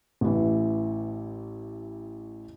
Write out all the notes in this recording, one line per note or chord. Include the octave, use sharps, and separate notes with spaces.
A1 E3